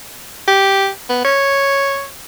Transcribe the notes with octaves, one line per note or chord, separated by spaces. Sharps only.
G4
B3
C#5